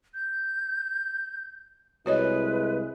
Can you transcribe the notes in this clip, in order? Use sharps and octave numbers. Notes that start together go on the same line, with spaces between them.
G6
C2 G#3 E4 F#4 B4 C#5 D#5